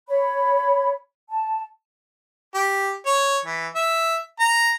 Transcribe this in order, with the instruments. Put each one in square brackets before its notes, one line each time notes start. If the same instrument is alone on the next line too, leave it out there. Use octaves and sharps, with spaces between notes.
[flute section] C#5 B5
A5
[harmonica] G4
C#5
E3
E5
A#5